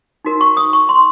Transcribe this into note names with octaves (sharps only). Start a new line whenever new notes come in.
D#4 F#4 A#4
C#6
D#6
C#6
C6